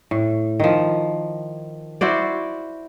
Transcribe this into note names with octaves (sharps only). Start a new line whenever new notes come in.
A2
D#3 F3
E4 F#4 C5 D5